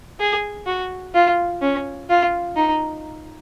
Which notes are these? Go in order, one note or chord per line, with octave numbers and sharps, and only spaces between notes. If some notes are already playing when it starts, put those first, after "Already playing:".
G#4
F#4
F4
C#4
F4
D#4